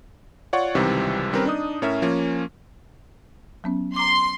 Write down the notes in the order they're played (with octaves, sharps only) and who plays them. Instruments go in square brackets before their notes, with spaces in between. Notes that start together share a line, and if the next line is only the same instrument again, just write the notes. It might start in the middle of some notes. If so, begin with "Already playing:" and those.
[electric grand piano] F4 C#5 D5 F#5 C#6
C#2 C3 D#3 E3 G3 C4
D#3 G3 C4 C#4 A#4 B4
D4 D#4 D#6
A2 C#4 A#4 E5
F3 A#3 C#4
[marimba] F#3 B3 C#4
[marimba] A#5 D6 [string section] C6